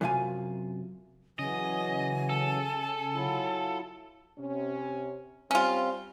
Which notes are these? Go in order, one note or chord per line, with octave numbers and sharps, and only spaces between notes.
F#2 C3 F4 F5 G#5
C#3 E3 F#3 D#5 G#5
A4
F#3 E4 F4
C3 C#4
G3 C4 C#4 F4